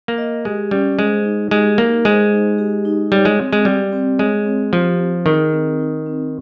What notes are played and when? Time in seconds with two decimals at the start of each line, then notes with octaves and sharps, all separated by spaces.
0.08 A#3
0.18 D#5
0.45 G#3 G4
0.71 G3 C#4
0.99 G#3 C5
1.25 D#4
1.51 G#3 G4
1.78 A#3 D#4
2.05 G#3 C5
2.32 D#4
2.58 G4
2.85 D#4
3.12 G3 C#5
3.25 G#3
3.39 C4
3.53 G#3
3.65 G3 G4
3.92 C4
4.19 G#3 C#5
4.46 C4
4.72 F3 G4
4.99 C4
5.26 D#3 G#4
5.53 C4
5.80 D#4
6.06 C4